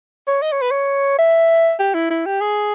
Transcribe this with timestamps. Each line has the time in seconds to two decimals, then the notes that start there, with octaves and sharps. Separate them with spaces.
0.28 C#5
0.42 D#5
0.52 C#5
0.61 B4
0.71 C#5
1.19 E5
1.80 G4
1.94 E4
2.10 E4
2.26 G4
2.41 G#4